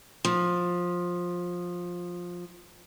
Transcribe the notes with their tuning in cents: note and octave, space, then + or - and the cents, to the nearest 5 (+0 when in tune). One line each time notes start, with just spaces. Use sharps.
F3 +15